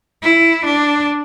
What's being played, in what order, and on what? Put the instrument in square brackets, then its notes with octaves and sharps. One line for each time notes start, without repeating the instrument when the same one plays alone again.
[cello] E4
D4